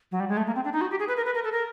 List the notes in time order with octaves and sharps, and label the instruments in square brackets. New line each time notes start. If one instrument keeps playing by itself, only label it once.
[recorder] F#3
G3
G#3
A3
A#3
C4
D4
D#4
F#4
G4
G#4
B4
A#4
B4
A#4
A4
A#4